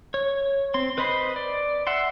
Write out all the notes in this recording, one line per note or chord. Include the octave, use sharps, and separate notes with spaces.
C#5
C4 C6
B4 C5 D#5 B5 C6
D5
E5 F#5 C6